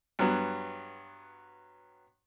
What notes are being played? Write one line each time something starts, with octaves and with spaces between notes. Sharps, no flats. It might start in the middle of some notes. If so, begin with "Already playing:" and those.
G2 F#3 B3